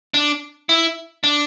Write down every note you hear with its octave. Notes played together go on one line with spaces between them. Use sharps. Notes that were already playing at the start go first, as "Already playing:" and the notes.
D4
E4
D4